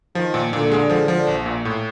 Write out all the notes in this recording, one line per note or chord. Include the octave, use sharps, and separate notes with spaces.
D#3 F3
A#2
A#2 D3
G#3
F3
F3
A#1
A#2
A2